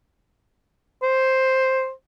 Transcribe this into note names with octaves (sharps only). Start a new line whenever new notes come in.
C5